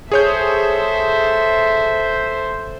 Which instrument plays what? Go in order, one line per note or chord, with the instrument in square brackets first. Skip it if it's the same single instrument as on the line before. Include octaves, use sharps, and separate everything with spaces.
[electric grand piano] G#4 C#5 G6 [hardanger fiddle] A4 E5 [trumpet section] C5